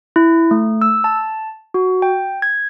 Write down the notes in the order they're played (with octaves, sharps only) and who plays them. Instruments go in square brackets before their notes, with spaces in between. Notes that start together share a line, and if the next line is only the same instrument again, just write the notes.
[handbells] E4
A3
E6
A5
F#4
G5
G#6